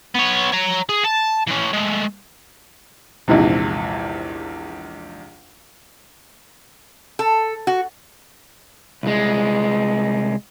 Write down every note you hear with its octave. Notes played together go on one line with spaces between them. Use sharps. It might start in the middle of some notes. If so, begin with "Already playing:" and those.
B3 C#5
C#5 A#5
G#4
A5
E3 C#4
G#3 A3
A#1 E2 G#2 C3
A4
F#4
C2 G#3